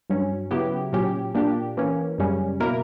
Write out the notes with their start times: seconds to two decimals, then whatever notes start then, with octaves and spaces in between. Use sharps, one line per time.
0.10 G2 F#3 C#4
0.51 C#3 F#3 B3 E4 G4
0.93 A#2 F#3 C#4 G4
1.35 A#2 A#3 D4 G4
1.77 E3 A#3 C#4
2.18 F#2 C#3 G3 C#4
2.60 B2 A#3 E4 A#4